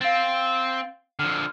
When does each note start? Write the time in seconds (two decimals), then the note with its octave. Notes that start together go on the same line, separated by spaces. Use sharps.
0.01 C4 F5 A6
1.19 D3 F3 F6